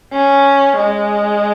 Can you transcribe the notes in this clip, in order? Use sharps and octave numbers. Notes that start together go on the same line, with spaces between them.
C#4
G#3